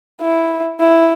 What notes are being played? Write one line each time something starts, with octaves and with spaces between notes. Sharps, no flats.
E4
E4